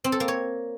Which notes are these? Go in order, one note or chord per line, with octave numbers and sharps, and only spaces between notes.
C4
A4
A#3
C#5